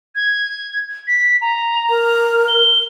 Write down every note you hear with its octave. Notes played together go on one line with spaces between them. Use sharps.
G#6
B6
A#5
A#4
G7